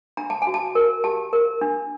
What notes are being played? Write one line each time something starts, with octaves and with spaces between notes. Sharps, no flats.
D4 A#5
A5
G#5
F#4
A5
A#4
G4 A5
A#4
D4